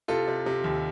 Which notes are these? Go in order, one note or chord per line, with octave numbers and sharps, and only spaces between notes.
C3 F4 A4
C3
C3
D#2